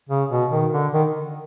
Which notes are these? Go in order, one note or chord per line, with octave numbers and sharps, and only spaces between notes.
C#3
B2
D#3
D3
D#3